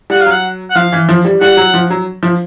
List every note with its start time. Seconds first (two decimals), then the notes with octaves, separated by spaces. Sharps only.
0.10 G3 F#5
0.20 F5
0.26 F#3 F#5
0.70 F#5
0.75 F3 F5
0.92 E3
1.09 F3
1.25 G3
1.41 G3 F#5
1.57 F#3
1.74 F3
1.90 F#3
2.23 F3